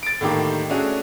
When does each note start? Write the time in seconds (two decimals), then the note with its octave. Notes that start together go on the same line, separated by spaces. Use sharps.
0.03 A6 D7
0.21 A2 D3 D#3 A#3 G4 D6
0.70 A3 C#4 D4 F#4 G#4